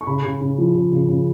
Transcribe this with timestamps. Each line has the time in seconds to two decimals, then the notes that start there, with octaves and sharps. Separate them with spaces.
0.01 C#6
0.07 C#3 B5
0.24 C#3
0.41 C#3
0.58 F3
0.75 C#3
0.92 C#3
1.08 C#3